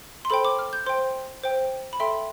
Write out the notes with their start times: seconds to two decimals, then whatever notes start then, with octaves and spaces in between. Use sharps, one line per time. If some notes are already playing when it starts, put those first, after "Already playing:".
0.25 C6
0.30 A4 C5 G5 B5
0.45 D6
0.59 F6
0.73 G6
0.86 C5 G5 C6
1.44 C5 G5
1.93 B5
2.00 A4 E5 G5 C6